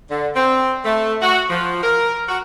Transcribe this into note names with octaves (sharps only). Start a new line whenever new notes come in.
D3
C4
A3
F#4
F3
A#4
F#4